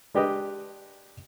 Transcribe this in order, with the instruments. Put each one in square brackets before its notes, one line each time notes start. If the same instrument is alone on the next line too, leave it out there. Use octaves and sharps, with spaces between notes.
[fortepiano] G#3 D4 G4 B4 D#5